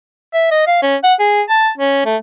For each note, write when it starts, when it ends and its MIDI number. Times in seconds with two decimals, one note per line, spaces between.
0.34 0.50 76
0.51 0.66 75
0.67 0.78 77
0.82 0.96 61
1.03 1.14 78
1.20 1.42 68
1.49 1.70 81
1.78 2.05 61
2.05 2.16 57